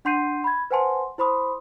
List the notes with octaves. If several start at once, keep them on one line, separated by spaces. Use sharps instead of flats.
D4 F#5 C6 G6 C7 D#7
B5 G#6
B4 C5 F#5 G#5 A5 C6
E4 C5 B5 C6 D#6